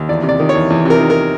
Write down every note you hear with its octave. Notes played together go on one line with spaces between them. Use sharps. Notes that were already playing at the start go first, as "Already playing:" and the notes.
Already playing: D#2
E2 D5
C3
D5
D#3
C#5
E2
E2
C3 A#4
D#3
A#4